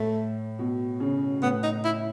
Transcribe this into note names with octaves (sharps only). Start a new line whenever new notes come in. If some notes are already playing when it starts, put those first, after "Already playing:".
Already playing: A2 A3
B2
C#3
A2 B3
D#4
E4